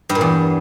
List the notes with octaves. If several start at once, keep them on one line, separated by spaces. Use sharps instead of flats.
G2
A#2
E2